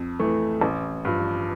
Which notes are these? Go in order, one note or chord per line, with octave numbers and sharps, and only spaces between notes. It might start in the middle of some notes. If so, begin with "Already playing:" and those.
Already playing: F2
E3 A3
A1
G2 F3